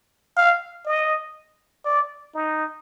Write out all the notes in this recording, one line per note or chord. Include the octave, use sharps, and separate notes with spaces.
F5
D#5
D5
D#4